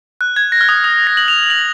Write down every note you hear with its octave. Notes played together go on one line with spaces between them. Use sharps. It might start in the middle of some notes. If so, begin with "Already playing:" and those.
F#6
G#6
A#6
F6
D#6
D#6
A#6
F#7
F7
F#7